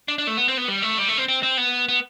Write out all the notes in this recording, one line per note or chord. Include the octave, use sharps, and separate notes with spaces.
D4
D4
A3
B3
C4
B3
G3
A3
G3
A3
C4
C4
C4
B3
B3